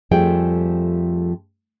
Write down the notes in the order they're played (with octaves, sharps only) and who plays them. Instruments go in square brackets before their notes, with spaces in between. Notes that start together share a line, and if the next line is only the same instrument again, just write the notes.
[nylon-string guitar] F2 F3 G3 A3 G#4 G5